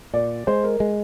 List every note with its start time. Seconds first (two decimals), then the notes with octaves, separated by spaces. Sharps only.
0.14 A#2 D5
0.47 G#3 C5
0.64 A#4
0.80 G#3